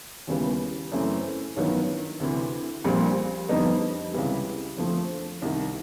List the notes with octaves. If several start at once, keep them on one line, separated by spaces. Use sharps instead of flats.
D#2 C#3 E3 G3 B3
F#2 C#3 E3 A3 C4
A1 G2 D#3 F#3 B3
D2 C3 E3
A#1 A#2 G3 C4
F2 D3 G3 B3 D#4
C#2 C3 E3 G3
F2 D3 F3 A3 C4
C2 C3 D#3